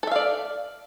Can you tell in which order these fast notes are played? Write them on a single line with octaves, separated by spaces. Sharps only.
A4 E5 F5 D5